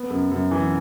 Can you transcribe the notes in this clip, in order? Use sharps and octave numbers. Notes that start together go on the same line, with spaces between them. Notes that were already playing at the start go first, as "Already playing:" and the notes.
Already playing: B3
F#2
F#2
E3